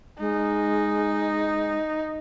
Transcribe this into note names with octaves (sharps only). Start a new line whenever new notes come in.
G#3 D#4